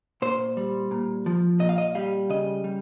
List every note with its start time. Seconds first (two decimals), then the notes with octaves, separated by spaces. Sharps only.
0.22 A#2 C5
0.57 G3
0.91 A#2
1.26 F3
1.60 A#2 D#5
1.69 F5
1.78 D#5
1.95 G3 F5
2.30 C#3 D#5
2.64 G3